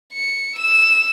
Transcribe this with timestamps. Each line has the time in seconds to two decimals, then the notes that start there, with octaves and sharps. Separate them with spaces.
0.13 C#7
0.56 E6 E7